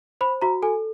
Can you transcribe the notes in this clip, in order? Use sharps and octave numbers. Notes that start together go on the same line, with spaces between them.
C5 B5
F#4 A#5
A4 G#5